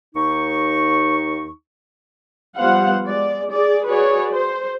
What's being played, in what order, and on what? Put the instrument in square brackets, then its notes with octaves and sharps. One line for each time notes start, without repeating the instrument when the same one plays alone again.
[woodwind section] D#2 D#4 C#6
[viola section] F3 G3 B3 C5 F5 F#5
G#3 D5
G#4 D5
F#4 G#4 B4 C#5 D5
C5